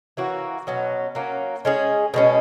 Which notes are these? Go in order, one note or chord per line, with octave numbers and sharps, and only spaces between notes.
E3 A#3 C#4 F#4
B2 F#3 C#4
F#3 A#3 C#4
G#3 C#4 G#4
B2 G#3 C#4